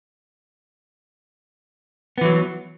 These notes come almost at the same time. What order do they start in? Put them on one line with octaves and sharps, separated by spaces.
B3 E3 F#3